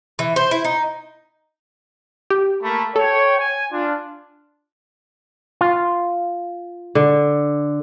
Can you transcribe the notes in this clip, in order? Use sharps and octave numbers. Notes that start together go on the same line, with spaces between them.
E3
C5
E4
D#4
G4
A3 A#3 B5
A4 C#5 G5
G#5
D4 F4
F4
D3